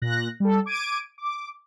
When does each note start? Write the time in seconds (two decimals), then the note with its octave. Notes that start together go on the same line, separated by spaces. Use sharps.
0.02 A#2 F#6 A#6
0.40 G3 A4
0.66 D6 G#6 D7 D#7
1.18 D6